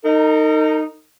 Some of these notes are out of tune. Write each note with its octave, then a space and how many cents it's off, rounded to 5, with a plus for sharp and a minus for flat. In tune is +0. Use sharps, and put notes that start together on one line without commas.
D#4 +0 A#4 -45